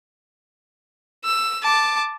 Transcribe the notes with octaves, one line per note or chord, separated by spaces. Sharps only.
E6
A5 D6